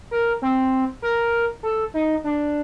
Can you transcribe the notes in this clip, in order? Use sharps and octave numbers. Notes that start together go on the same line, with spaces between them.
A#4
C4
A#4
A4
D#4
D4